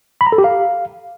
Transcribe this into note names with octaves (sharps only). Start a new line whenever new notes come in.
B5
A#5
A4
G4
F5